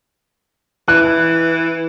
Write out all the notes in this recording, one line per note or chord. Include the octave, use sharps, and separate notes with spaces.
E3 F#6